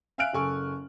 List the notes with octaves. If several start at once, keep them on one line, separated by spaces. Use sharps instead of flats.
E5 F5 G#5 F6 F#6 D7
F#1 A4 G#5 C#6